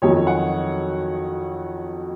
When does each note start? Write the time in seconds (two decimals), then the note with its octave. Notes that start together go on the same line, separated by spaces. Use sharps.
0.02 F2 D#3 F#3 C#5
0.27 F#5